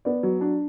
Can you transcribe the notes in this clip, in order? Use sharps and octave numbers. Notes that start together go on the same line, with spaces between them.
B3 D5
F#3
D4